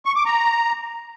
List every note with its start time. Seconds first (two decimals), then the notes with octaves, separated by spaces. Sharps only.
0.05 C#6
0.16 D6
0.26 A#5